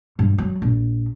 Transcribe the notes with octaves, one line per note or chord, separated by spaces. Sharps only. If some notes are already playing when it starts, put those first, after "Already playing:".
G2
F#3
A#1